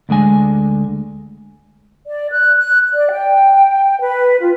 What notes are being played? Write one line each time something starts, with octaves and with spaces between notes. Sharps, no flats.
D2 D3 G#3 G#5
D5
F#6
F#6
D5
G5
B4
F4